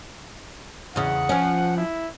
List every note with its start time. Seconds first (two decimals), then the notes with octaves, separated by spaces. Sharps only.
0.96 E2 C#3 F#5
1.29 F3 C#4
1.77 E4